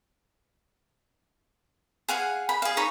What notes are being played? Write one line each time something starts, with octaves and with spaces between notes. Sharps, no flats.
G#4 F5 F#5 G#5
B5
G#4 F5
D#4 C#5 B5